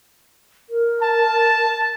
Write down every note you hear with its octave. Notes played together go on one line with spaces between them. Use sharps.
A#4
A5